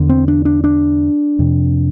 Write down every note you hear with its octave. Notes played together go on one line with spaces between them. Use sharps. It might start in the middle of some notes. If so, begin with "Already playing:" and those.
Already playing: E2 D3
C4
D4
D4
D4
F2 C3